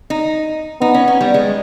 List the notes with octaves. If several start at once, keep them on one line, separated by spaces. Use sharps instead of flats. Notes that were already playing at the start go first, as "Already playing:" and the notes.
D#4
B3 D#4
C#4
C#4
G3
G#3